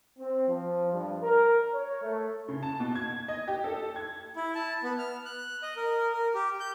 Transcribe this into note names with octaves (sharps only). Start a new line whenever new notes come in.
C4
F3
G2
A#4
C#5
A3
C#3
A5
B2
G#6
D#5
G4
A4
G#6
E4
A5
B3
F6
F#6
D#5
A#4
A#4
G4
G6